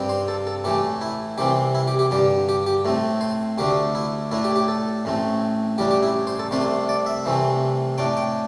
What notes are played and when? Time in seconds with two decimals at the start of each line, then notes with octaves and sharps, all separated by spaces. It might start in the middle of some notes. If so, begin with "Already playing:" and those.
Already playing: G2 G3 C4
0.09 C5
0.28 A4
0.47 A4
0.64 A2 E3 A3 G4
1.01 E4
1.38 C2 C3 E3 C4 G4
1.75 E4
1.87 G4
1.99 G4
2.11 G2 D3 G3 G4
2.49 G4
2.66 G4
2.85 A2 A3 C4
3.21 C5
3.58 D2 D3 A3 D4 G4
3.95 E4
4.31 A2 A3 D4 E4
4.44 G4
4.56 G4
4.68 A4
5.05 A1 A2 A3 C4
5.78 A1 A2 G3 D4 G4
5.91 G4
6.03 E4
6.27 C5
6.39 A4
6.51 C2 C3 A3 D4 C5
6.89 D5
7.06 E5
7.25 C2 C3 E3 A3 C4
7.98 A2 A3 D4 G5
8.17 G5